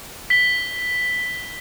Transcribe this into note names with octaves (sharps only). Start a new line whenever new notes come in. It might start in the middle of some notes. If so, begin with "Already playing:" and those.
B6 G7